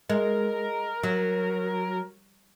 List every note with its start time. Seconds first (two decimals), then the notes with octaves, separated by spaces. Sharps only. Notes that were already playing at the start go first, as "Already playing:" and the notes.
0.10 G#3 A#4
1.03 F#3